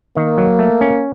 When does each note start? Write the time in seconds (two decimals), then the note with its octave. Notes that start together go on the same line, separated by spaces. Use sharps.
0.16 D#3 A#3
0.38 F#3
0.59 A3
0.81 C#4